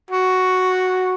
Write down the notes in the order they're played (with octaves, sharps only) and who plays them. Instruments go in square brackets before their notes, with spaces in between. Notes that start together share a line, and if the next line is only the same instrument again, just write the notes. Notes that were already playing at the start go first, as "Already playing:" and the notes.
[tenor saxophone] F#4